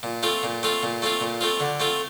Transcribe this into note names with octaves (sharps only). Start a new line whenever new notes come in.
A#2
A3 C4 F4
A#2
A3 C4 F4
A#2
A3 C4 F4
A#2
A3 C4 F4
D3
A3 C4 F4